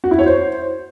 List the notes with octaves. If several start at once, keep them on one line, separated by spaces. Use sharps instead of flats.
F#4
E4
C#5
C5